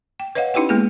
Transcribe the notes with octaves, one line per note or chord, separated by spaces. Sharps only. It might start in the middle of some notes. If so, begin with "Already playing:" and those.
G5
B4 C#5 D#5 F5 F#5
C#4 D#4 E4 G4 B4 G5
G#3 A#3 B3 E4 G#4